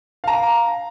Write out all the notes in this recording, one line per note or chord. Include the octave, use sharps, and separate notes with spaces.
F5 A#5